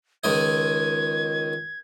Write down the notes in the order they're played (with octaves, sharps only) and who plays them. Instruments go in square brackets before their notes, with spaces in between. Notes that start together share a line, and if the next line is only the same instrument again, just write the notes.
[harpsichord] C#2 D#3 D#5 [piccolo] G#6